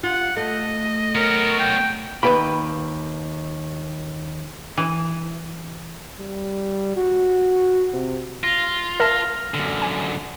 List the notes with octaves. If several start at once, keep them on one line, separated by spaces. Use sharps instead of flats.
F4 F#5
A3 D#5
B3 A#4 C#5
G5
D#2 G#2 B4 G5 B5
E3
G3
F#4
C3
F4 A#6
A#4 E5 A5 F6 A#6
F#2 D3
G#5